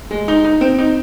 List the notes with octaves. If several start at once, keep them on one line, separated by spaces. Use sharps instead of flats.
G#3
D#4
D#4
C4
D#4